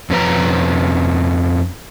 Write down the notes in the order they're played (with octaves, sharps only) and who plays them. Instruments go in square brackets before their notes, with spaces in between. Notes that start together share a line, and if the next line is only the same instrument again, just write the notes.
[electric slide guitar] F2 C#4 B4 A#5